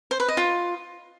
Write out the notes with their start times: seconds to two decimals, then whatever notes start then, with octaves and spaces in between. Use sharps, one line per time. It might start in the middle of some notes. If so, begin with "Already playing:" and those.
0.11 C5
0.20 B4
0.28 D#5
0.37 F4